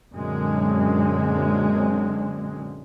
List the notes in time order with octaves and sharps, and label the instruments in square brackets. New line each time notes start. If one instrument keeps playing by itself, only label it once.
[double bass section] F#2 A#2 D3 G#3 C4